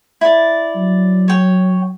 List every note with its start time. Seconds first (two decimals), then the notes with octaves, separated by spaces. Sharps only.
0.21 E4 D5
0.76 F#3
1.28 C#5 G5